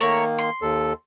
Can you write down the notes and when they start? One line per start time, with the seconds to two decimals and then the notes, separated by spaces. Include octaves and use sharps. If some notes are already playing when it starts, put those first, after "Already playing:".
0.01 D#3 A3 A#3 A#4 C#5
0.38 C6
0.62 D#2 A4